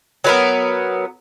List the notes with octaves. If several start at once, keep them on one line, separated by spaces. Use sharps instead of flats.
F#3 B3 A#4